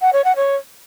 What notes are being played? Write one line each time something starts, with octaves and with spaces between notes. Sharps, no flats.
F#5
C#5
F#5
C#5